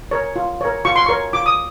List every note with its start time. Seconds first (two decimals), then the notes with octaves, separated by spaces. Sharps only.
0.11 A#4 C#5
0.36 F4
0.61 A#4 C#5
0.85 F4 C#6
0.96 C6
1.06 A#4 C#5 C#6
1.33 F4 D6
1.46 D#6